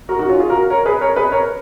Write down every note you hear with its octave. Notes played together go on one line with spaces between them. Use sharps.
F#4 A#4
D#4 F#4
C#4 F4
F4 G#4
F#4 A#4
A#4 C#5
G#4 B4
A#4 C#5
G#4 B4
A#4 C#5